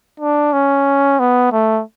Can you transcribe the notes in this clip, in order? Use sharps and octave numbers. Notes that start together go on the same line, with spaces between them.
D4
C#4
B3
A3